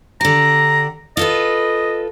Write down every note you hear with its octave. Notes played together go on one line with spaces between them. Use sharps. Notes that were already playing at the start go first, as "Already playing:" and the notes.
D3 G4 A#5
F4 A4 B4 D#5